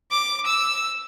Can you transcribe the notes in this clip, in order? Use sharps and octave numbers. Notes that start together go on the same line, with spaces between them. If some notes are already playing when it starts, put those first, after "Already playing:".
D6
E6